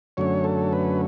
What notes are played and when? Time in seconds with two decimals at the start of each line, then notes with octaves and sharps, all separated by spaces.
0.17 F#2 D3 F#3 A3 C#4 C#5
0.44 A4
0.73 B4